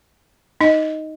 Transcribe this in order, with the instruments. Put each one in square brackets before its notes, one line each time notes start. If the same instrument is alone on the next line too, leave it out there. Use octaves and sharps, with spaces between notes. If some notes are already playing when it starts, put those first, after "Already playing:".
[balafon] D#4 D#5